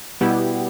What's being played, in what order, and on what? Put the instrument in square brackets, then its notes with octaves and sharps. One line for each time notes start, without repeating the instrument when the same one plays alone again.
[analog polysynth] B2 G3 B3 E4 G4